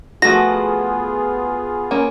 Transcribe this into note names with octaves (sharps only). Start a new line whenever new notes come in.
F3 A3 B3 F4 F#4 G#4 A#6
A#3 C#4